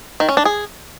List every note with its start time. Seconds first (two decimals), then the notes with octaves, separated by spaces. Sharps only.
0.20 D#3
0.29 C#4
0.37 D4
0.45 G#4